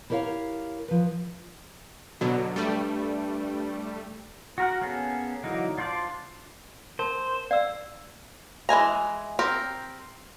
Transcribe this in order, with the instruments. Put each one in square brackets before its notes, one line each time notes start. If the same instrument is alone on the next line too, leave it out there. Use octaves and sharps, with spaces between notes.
[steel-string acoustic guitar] E4 G4 A#4 C#5 F5
F3 B4
[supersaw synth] B2 D3 F#3
[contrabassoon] G2 [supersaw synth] G3 A3
[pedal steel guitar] F#4 A#4 F#5
A#3 B3 C#4 G#4 A4
D3 E3 F#3 A#3 D#4
D4 F4 C5 D5 A5
[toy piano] A#4 A5 [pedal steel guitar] C5
[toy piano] D5 E6 [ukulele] F5
[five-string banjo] E3 G#3 G#5 A#5
C4 G4 A#4